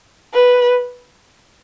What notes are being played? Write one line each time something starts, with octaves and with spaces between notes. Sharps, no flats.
B4